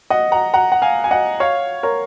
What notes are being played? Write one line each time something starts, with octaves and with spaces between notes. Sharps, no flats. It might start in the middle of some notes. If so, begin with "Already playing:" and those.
D#5 F#5
F#5 A#5
F#5 A#5
F#5
F5 G#5
G#5
D#5 F#5
C#5 F5
A#4 C#5